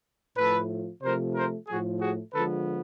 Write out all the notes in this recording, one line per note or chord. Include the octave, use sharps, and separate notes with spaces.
A2 F3 A3 A4 B4
C3 F3 A3 A#4 C5
A#4 C5
A2 F3 A3 F#4 G#4
F#4 G#4
D3 F3 G#3 B3 A4 B4